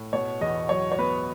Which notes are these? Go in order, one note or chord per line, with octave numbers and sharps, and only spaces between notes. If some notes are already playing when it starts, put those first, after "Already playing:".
Already playing: A2
B2 C#5
E2 D#5
F#3 C#5
C#5
B3 B4